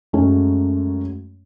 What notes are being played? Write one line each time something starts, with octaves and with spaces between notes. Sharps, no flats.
F#2 F#3 G#3 A3 C#4